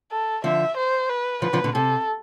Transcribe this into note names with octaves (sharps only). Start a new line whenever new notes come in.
A4
D3 F3 E5
C5
B4
D3 F3 B4
D3 F3
B2 D3
C3 A4